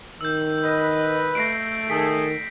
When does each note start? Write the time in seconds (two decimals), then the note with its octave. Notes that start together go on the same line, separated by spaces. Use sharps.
0.21 D#3 E6 G6
0.63 B4 D#5
1.35 A3 A#6 C7 D7
1.90 D#3 G#4 A4 B6